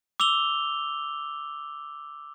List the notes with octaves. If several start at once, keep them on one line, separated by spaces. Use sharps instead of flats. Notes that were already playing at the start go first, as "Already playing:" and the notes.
D6 E6 F7 G7